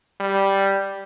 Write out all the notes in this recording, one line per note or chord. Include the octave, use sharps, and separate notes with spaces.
G3